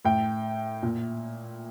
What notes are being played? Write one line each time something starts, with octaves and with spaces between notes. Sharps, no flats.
A2 G5
A#2